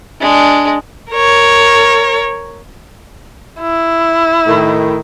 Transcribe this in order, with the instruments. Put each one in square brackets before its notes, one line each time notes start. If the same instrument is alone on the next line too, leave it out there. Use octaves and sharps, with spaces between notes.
[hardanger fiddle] G#3 D4
[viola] A#4 C#5
[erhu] E4
[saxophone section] A2 D#3